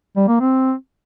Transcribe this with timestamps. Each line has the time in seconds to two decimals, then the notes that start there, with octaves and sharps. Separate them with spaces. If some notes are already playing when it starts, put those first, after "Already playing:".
0.16 G3
0.28 A#3
0.40 C4